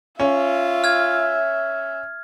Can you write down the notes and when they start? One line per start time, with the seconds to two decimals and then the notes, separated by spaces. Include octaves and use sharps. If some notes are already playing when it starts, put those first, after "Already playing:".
0.20 C#4 F4 E5
0.84 F6 G#6